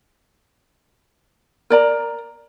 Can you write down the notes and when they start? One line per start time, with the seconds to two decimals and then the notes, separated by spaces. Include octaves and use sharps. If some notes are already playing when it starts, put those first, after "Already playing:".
1.70 A#4 D5 A#5